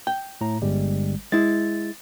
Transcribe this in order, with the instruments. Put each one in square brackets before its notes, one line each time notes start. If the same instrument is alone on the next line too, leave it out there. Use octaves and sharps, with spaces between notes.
[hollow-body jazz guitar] G5
[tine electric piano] A2 A#5
G1 G3 G#3
[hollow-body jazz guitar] G#3 E4 [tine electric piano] A6